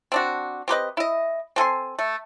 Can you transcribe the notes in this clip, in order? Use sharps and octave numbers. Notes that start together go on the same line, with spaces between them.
C4 D4 F#4
C4 G4 B4 D#5
E4 D#5
C4 A4 G#5 C6
A3